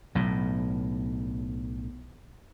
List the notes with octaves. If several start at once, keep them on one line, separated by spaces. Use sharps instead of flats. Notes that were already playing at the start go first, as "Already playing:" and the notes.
B1 A2